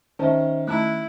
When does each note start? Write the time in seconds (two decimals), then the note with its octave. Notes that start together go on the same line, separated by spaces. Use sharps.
0.19 D#3 C#4 D4 C5 E5 A5
0.68 A3 D#4 E4 A5 F#6